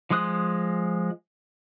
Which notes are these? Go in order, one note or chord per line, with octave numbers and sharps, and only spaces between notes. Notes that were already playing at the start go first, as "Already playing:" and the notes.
F3 G#3 C6 D#6 F#6